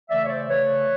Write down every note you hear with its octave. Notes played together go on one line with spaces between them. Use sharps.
C#3 E3 A3 D5 E5
C#5
C5 D5
C#3 E3 A3 B4 C#5